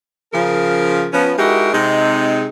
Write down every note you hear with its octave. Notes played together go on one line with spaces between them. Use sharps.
C#3 F3 A#4
F3 B3 C#4
G#3 D#4 E4 F#4 G4 A#4
C3 G#3 D#4